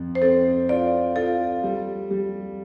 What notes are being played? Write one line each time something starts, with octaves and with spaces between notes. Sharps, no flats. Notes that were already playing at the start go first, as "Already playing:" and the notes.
Already playing: F2
C5
C4 A4
F4 D5
F4 A4
G3
G3